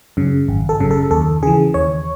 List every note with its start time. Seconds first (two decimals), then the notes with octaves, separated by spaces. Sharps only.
0.17 F#2 C#3
0.48 G#1
0.69 A4
0.80 F#2 C#3
0.91 A4
1.11 D#2 A4
1.43 C#3 G#4
1.47 E3
1.74 D#2 C#5